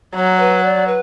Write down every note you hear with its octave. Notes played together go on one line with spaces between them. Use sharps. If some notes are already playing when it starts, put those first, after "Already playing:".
F#3 C#5
B4
D5
B4